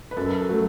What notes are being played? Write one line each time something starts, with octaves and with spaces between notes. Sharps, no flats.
B4
F#2 A4
F#3 A3